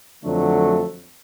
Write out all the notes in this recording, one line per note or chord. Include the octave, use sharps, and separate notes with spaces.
F2 D3 F#3 A3